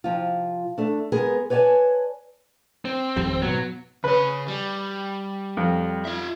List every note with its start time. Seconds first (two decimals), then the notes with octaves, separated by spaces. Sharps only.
0.04 C3 F3 F4
0.78 A3 D4
1.12 G#3 B3 G#4 A#4
1.50 B4 C#5 D5 F#5 G#5 A5
2.85 C4
3.16 G#1 F2 G3
3.42 G#2 B2 F#3 B3
4.04 C#3 B4 C#5
4.48 G3
5.57 F2
6.05 F4 E5